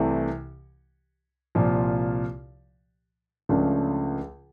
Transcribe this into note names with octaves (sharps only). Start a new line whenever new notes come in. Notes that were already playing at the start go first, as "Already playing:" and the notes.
Already playing: C2 C3 E3 A3
C2 A#2 F3
C#2 C#3 F3 A3 D4